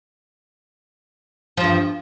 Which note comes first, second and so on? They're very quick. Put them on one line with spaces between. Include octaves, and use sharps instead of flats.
F3 G2 E2